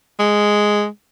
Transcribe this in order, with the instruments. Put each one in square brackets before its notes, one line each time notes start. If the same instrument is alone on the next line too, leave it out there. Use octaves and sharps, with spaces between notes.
[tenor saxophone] G#3